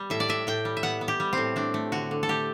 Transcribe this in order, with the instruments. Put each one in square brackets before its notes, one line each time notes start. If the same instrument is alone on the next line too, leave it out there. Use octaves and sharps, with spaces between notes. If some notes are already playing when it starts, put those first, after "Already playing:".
Already playing: [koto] G3 B3
A2 E5
D5
A2 E5
A2 G5
G3
E5
B3 F#5
B3
G4
G3
A2 C4
A3 D4
A3
D3 F#4
D3
A4
A3 G4